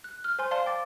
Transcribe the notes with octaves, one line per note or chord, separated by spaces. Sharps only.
F#6
F6
C5 G#5 C6
D5 F5 A5 C6
G5 D6 A6